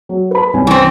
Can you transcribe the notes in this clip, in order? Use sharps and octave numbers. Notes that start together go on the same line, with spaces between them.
F#3
B4 B5
C2 C#4 G#5
E3 C4